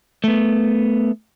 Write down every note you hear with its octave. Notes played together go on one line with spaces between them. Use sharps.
A3 B3